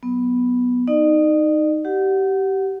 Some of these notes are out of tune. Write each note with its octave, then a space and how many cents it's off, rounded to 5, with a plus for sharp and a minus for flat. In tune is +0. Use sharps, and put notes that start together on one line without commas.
F#3 +0 B3 +0
D#4 +0 D5 +45
G4 -20 F#5 +0